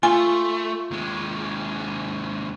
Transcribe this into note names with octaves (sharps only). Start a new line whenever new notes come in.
A3 F4 G#5
D#2 G#3